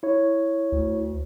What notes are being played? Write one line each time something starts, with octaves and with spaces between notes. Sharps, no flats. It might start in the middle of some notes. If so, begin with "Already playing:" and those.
E4 C#5
D2